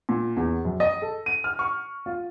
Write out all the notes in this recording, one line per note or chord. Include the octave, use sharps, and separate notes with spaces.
A#2
E2
F#2
D#5
A4
D#7
F6
C#6
F4